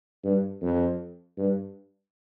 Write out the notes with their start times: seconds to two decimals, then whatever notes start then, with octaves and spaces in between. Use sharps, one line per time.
0.24 G2
0.62 F2
1.38 G2